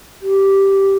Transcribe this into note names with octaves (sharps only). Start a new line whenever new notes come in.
G4